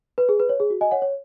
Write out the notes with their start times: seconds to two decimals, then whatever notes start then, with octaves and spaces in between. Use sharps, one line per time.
0.18 B4
0.29 G#4
0.40 B4
0.49 C#5
0.60 G#4
0.70 F#4
0.81 D#5 G#5
0.91 C#5 F#5
1.02 C#5